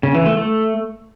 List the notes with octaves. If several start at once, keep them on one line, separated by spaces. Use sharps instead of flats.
C#3
E3
A3
A3